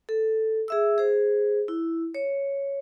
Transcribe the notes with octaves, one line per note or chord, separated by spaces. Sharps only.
A4
G#4 E5 E6
G#4 C5
E4
C#5